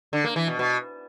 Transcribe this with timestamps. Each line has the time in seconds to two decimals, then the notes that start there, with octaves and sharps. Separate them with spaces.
0.13 D3
0.24 A#3
0.36 E3
0.48 B2
0.59 B2